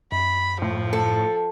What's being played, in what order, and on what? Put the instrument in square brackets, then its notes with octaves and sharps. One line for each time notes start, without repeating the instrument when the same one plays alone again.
[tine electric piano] F#2 [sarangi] B5
[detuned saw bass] A2 [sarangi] F3
[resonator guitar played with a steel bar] A4